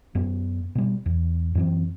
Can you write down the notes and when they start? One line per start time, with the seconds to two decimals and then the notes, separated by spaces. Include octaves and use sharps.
0.15 F#2 B3
0.75 B2 G3
1.06 E2
1.55 F#2 E3 C4